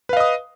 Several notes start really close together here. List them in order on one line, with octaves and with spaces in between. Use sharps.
B4 F5 D#5 D#6